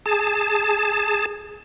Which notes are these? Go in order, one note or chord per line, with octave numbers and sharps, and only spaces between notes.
G#4 A5